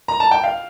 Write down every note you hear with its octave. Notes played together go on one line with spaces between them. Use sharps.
A#5
A5
G5
F5